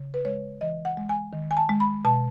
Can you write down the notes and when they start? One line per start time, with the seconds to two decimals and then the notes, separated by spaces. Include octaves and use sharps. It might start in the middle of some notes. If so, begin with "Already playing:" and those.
Already playing: C#3
0.14 B4
0.25 G#3 C#5
0.61 E3 D#5
0.85 F#5
0.97 G#3
1.09 G#5
1.33 D#3
1.51 G#5
1.57 A5
1.69 G#3
1.80 B5
2.05 B2 A5